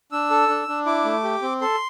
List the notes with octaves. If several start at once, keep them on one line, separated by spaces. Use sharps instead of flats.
D4 E6
A4
D4
D4
E4 D6
A3
G4
C4
A4 C6